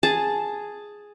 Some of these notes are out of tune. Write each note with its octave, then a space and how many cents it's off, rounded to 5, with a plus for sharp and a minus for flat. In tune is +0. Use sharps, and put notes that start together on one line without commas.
G#4 +0 A5 +0